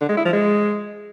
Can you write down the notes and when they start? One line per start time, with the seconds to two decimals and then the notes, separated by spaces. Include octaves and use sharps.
0.01 D3
0.09 G#3
0.17 E4
0.25 F3
0.33 G#3